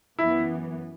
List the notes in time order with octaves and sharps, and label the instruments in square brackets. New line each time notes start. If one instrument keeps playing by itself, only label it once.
[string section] F#2 E3 B3 [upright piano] E4